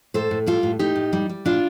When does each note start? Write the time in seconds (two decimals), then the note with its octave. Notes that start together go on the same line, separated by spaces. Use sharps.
0.14 A2 A4 C5
0.31 A2
0.46 G3 F4 A4
0.63 A2
0.79 A2 D#4 G4
0.96 A2
1.13 G3
1.29 G3
1.45 A2 D4 F4